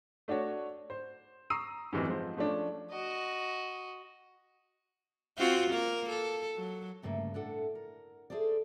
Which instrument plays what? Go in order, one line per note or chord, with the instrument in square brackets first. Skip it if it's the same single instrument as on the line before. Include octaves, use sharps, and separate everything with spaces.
[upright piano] A3 D4 F#4 C#5
C5
A#5 C#6 D#6 E6 C7 D#7
F#2 A2 C3 D#3 E3 G3
G#2 F3 C5
F3 A3 C#4 D4
[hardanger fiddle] F#4 D#5
[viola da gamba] C4 F4 F#4
A#3 A#4
A4
F#3
[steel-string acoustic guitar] D2 G2 C#3 A3 A#3
A2 D4 A4 F#5
A#4
G#4 A4 C5 D5